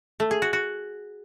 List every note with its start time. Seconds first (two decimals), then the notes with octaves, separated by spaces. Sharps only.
0.20 A3
0.31 G#4
0.42 F#4
0.53 F#4